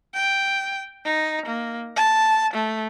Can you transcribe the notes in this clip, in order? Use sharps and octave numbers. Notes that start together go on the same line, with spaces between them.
G5
D#4
A#3
A5
A3